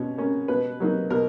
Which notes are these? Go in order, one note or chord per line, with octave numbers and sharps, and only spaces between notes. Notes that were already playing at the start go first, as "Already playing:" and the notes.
Already playing: B2 C#4
A#3 C#4
B2 B4
F#3 A#3 D#4
B2 A#4